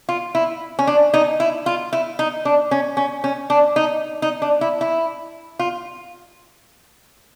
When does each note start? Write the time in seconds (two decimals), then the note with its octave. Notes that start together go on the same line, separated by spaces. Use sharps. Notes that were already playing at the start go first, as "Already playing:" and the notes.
0.09 F4
0.35 E4
0.79 C#4
0.87 D4
1.14 D#4
1.40 E4
1.66 F4
1.93 E4
2.19 D#4
2.45 D4
2.71 C#4
2.97 C#4
3.24 C#4
3.50 D4
3.76 D#4
4.22 D#4
4.42 D4
4.61 E4
4.81 E4
5.59 F4